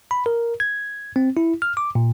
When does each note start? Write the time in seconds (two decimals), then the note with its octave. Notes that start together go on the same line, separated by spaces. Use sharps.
0.11 B5
0.26 A#4
0.60 G#6
1.16 C4
1.37 E4
1.62 F6
1.77 D6
1.95 A#2